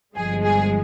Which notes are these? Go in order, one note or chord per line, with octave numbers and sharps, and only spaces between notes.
G1 G2 F3 G#3 G#4
G#4